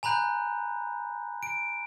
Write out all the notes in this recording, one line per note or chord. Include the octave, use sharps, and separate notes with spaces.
G#5 A#5 B5 F#6 G6
D7